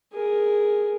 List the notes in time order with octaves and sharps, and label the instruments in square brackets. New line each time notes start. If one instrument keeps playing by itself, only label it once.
[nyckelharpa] G#4 A#4